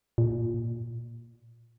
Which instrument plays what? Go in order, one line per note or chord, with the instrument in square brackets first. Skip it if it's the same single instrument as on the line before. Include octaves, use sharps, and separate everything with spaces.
[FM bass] A#2